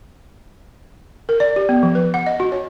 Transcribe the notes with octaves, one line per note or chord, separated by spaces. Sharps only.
A#4
D5
G4
B3
F3
B4
F#5
D#5
F#4
C#5